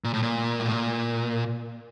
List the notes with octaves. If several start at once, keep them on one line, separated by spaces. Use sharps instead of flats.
A#2
A2
A#2
A2
A#2